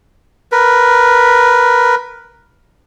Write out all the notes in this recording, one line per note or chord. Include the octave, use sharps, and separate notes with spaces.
A#4 B4